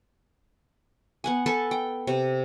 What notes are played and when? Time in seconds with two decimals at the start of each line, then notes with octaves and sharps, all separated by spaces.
1.24 B3 F#5 G#5
1.46 A4 B4 G#5 A5
1.71 G5
2.07 C3